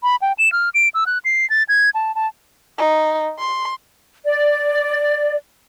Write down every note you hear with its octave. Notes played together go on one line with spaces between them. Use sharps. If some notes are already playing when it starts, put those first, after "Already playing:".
B5
G5
E7
F6
D7
E6
F#6
C7
A6
G#6
A5
A5
D#4
C6
D5